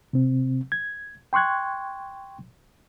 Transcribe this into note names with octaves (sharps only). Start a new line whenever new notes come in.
C3 C4
G#6
G5 C6 C#6 F#6 G#6